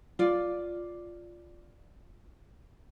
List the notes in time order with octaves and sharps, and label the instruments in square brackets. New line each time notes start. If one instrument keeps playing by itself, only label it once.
[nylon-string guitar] F4 D5